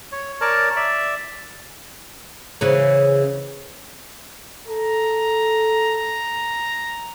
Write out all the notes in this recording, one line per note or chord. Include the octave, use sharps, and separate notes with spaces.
C#5
A#4 C#5 D5 A5
D5 E5
C#3 E3 C#4
A4 A#5